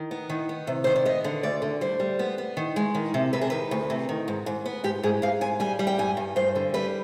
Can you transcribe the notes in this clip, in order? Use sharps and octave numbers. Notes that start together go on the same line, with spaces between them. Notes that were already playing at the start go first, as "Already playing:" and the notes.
Already playing: D#3
B3
D#3
B3
C3
D#3 C5
D5
B3 D#5
D3
D2 D5
D3
G3 C5
G3
B3
B3
D#3
G#3
D#3
C3
C3 B4
G#4
D#3 B4
D2
C3
D#3
G#2
G#2
B3
G#2 G4
G#2 G#4
G#2 F5
G#2 G#5
G3 G#5
G3
G5
G2 G#5
G2
G2 C5
D3
G3 B4